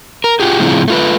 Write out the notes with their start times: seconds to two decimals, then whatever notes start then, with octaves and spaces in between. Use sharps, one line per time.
0.24 A#4
0.40 F4 G4 G#4
0.59 A2 C#3 F3 C4 E4 G#4
0.88 A3 F4 B4